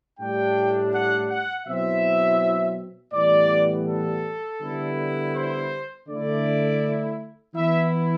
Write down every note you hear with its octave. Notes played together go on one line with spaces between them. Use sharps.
A2 G3 D4 G5
F#5
F#5
B2 F#3 C4 E4 E5
A2 E3 G3 B3 D5
A4
D3 G3 B3 E4
C5
D3 A3 E4 D5
E3 B3 E4 E5